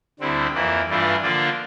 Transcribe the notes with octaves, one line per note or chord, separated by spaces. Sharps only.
D2 D3 G3 C4 E4
F2 E3 A#3 E4
G2 E3 A3 D4 F4
D3 F3 A#3 D4 F4